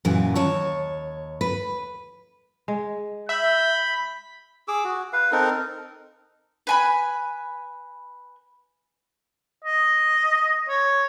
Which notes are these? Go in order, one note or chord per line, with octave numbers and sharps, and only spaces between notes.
F#2 A#2 E3
D#2 C#5 A5
B4
G#3
E5 B5 G6
G#4 D6 E6
F#4
B4 F5
C4 D#4 A4 A#4
B4 G#5 B5
D#5
C#5